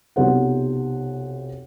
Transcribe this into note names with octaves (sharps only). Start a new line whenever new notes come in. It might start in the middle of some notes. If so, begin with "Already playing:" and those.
B1 C3 F3 C5 F#5